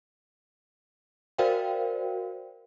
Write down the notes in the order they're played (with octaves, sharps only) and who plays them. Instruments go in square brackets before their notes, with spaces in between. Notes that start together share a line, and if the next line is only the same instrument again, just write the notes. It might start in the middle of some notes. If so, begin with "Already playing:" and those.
[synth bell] F#4 A#4 C5 D5 F5 G5